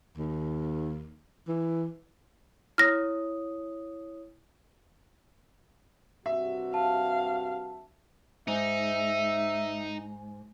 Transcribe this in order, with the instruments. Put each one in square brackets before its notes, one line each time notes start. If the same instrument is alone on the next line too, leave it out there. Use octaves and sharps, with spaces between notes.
[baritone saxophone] D#2
E3
[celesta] E4 C#5 D#6 [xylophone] F6 A#6
[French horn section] G2 C3 F#4 [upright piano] E5
[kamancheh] F5 [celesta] A5
[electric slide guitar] G#2 [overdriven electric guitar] D#4 [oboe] E5